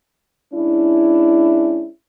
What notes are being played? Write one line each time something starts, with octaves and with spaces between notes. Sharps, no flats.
G#3 C#4 D4 E4